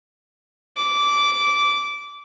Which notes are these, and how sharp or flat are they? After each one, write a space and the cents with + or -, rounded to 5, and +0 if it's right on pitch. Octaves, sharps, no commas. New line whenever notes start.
D6 -15